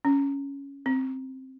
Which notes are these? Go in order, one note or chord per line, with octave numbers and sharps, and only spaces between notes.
C#4
C4